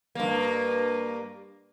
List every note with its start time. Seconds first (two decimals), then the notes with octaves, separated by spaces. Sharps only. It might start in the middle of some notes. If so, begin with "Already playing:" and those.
0.15 G2 A#3